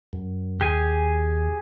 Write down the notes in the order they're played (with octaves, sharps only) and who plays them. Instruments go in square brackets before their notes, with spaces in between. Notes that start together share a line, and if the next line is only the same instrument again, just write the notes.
[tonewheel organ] F#2
[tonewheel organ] D#2 [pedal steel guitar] G4 G#4 G#5